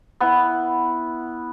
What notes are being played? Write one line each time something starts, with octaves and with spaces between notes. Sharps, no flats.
B3 E4